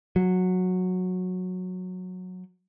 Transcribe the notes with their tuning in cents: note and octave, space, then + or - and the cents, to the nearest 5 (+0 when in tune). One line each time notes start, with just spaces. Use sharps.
F#3 -15